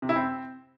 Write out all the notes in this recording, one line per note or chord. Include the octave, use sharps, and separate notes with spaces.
C3
E4
C4